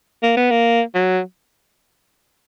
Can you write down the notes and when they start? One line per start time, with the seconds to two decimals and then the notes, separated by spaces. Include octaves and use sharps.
0.23 A#3
0.37 B3
0.51 A#3
0.95 F#3